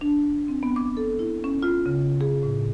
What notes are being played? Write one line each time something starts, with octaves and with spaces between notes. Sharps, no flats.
D4
C4
B3
D6
A4
E4
C#4
F4
C#3
G#4
A2